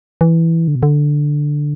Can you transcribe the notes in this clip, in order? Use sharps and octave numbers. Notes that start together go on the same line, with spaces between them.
E3
D3
B2
D3